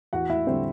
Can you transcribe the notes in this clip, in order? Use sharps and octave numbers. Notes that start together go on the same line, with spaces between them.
E2 F#4 F#5
E4 E5
D3 G3 C4 C5